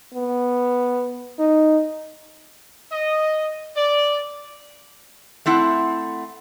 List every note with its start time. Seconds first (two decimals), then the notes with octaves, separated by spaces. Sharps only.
0.14 B3
1.39 D#4
2.92 D#5
3.77 D5
5.46 A3 C4 E4 F#5